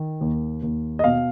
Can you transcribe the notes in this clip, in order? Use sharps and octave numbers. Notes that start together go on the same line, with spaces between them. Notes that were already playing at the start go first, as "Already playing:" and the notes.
Already playing: D#3
D#2
D#2
D#5
B2 F5